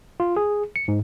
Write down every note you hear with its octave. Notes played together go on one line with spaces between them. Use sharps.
F4
G#4
C#7
G#2